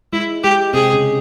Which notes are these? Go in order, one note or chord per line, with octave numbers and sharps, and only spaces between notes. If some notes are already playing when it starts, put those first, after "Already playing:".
G#3 E4
G#3 G4
C3 C4 G#4
C#3 C#4